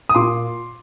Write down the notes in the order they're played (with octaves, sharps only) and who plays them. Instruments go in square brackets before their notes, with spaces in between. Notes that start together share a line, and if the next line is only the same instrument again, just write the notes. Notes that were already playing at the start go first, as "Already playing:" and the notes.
[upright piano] D#6
A#2 C6 D6